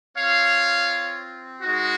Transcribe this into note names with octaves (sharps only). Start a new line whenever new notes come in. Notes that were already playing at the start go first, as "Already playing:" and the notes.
C4 F4 C#5 F5
G#3 D#4 F#4